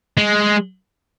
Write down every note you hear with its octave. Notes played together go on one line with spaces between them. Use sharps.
G#3